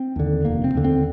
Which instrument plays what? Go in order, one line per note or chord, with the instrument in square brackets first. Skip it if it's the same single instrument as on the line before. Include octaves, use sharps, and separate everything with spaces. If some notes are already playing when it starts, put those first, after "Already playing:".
Already playing: [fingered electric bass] C4
D#2 D3
F1 A#3
C4
D#2 D3
C4